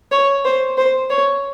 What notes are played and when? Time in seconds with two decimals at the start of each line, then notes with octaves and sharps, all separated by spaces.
0.12 C#5
0.45 C5
0.78 C5
1.10 C#5